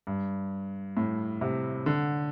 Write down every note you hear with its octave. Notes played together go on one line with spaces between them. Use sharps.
G2
A2
C3
D3